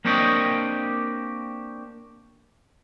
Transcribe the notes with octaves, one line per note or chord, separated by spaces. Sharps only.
A#3 C4 D4 G4 C#5 D#5